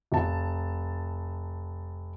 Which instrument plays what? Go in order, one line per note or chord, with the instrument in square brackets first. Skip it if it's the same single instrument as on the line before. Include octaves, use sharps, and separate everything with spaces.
[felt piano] F1 A5